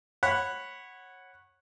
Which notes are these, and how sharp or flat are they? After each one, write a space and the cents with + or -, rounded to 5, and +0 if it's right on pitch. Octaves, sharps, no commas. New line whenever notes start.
C#5 -20 F#5 +0 B5 +0